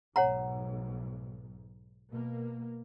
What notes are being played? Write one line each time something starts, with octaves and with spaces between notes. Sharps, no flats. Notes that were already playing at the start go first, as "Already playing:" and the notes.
B1 G#2 C#5 F#5 A#5
B2 A#3